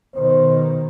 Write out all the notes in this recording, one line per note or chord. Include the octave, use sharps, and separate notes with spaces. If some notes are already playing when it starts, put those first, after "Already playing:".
B2 D#3 C5